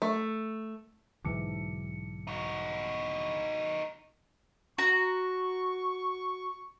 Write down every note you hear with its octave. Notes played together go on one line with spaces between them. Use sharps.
A3
B1 G#2 D3 E3 C#7
D#4 F#4
F#4 A#5 C#6